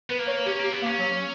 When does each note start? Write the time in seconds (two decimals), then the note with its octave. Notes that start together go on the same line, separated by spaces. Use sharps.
0.10 B3 B4
0.19 A#3
0.28 C#5
0.46 C#4 G4
0.60 A#3 G4
0.73 B3
0.82 A#3
0.86 C#4
0.99 F#3